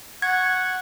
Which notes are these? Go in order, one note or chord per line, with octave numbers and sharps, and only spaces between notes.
F#5 C#6 G#6